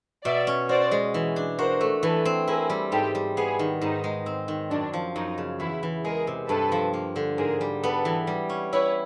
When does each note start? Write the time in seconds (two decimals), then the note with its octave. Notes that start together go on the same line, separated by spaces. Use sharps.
0.24 B2 D5 E5
0.47 C#4
0.69 F#4 C5 D5
0.91 G#3
1.14 E3
1.36 D4
1.59 F#4 A#4 C5
1.81 A3
2.03 E3 A4 B4
2.25 C4
2.48 E4 G#4 A#4
2.70 G3
2.92 G#2 G4 A4
3.15 G3
3.37 B3 G#4
3.59 D#3
3.82 G#2 D#4
4.04 G#3
4.26 C4
4.48 D#3
4.70 F#2 D4
4.94 F3
5.16 F#2 D#4
5.38 C#3
5.60 E2 E4
5.83 E3
6.05 G#3 G#4 A#4
6.27 C3
6.49 G2 A4 B4
6.72 F3
6.94 A#3
7.16 D3
7.38 G#2 G#4 A#4
7.61 G3
7.83 B3 A4 B4
8.05 E3
8.27 G3
8.49 C#4
8.72 E4 B4 C#5